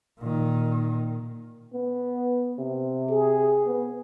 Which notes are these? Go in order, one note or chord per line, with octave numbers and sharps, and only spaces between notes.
A#2 D#3
B3
C3
G#4
B3